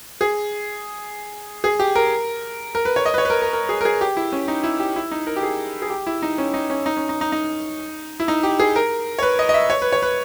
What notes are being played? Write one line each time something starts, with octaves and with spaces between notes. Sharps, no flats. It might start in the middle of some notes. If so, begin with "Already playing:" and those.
G#4
G#4
G4
A#4
A#4
B4
C#5
D#5
B4
C#5
B4
A#4
A#4
A#4
G#4
A#4
G#4
G4
E4
C#4
D#4
E4
G4
E4
D#4
A#4
G4
G#4
G#4
G4
E4
D#4
C#4
D#4
C#4
D#4
C#4
D#4
D#4
D#4
E4
D#4
G4
G#4
A#4
C#5
B4
D#5
D#5
E5
C#5
B4
C#5
B4